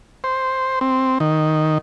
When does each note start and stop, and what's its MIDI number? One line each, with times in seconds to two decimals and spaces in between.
0.24 0.79 72
0.81 1.18 60
1.20 1.78 51